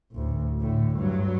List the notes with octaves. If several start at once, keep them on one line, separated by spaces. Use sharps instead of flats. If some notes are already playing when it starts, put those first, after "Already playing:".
A1 D2
A2 D3
G2 F#3